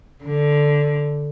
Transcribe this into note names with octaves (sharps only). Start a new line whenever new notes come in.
D3